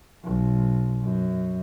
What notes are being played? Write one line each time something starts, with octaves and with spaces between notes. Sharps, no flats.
B1
F#2